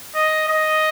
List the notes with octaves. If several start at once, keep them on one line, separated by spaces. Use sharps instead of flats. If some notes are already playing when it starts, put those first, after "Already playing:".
D#5
D#5